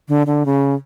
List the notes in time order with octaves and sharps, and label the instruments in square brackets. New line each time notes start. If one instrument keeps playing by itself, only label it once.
[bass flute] D3
D3
C#3